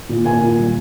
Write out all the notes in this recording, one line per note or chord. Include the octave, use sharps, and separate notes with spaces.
A#2
A#3 G#5
A#2
G3